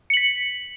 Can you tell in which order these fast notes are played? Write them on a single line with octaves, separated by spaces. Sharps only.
C#7 F#7 B6